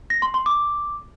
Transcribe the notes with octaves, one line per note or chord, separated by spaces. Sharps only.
A#6
C6
C6
D6